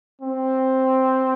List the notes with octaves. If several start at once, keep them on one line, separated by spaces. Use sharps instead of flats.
C4